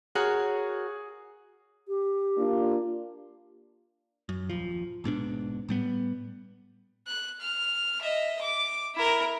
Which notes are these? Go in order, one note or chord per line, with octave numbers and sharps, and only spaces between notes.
F#4 G#4 A#4 C#5
G4
A#3 D4 F4
F#2
D#1 F3
A#1 G#2 B2 D4
A2 G3 B3
F#6
F6
D#5 E5
D6
E4 A#4